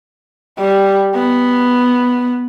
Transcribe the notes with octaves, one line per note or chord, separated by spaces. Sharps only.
G3
B3